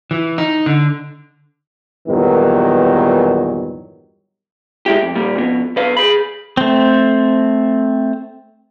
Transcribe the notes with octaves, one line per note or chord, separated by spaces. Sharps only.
E3
D#4
D3
E2 G2 A#2 D#3 F#3 B3
G#3 E4 G4
F2
A#2 G3
F2 B2
B1 B4 F5
G#4 B5
A3 C4